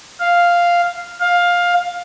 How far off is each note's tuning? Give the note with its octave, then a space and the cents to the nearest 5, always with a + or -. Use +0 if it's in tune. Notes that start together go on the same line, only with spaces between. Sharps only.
F5 +0
F5 +15